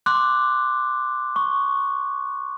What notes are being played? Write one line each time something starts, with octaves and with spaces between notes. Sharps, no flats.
C6 D6 F#6
C#6